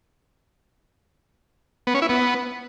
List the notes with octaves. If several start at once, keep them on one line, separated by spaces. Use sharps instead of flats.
B3
C#4
E4
B3